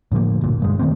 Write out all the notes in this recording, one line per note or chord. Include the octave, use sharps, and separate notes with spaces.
A2 D3 F3 A#3
G1 D2 A#2
E1 G2 G#3
D#3 A3 A#3 C4